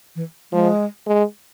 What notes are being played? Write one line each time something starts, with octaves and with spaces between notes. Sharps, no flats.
E3
F3 G#3
G#3